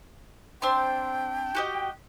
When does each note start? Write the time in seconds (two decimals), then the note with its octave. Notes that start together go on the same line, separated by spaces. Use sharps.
0.62 C4 D4 G5 C6
1.55 F#4 G4 D#5